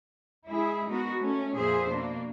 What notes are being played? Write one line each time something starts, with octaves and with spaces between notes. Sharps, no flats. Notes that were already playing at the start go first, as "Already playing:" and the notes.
G#3 E4 G#4
G#3 B3 D#4 F#4 A#4
A3 C#4
F2 A#2 A#3 G#4 C5 E5
B2 A#3 D4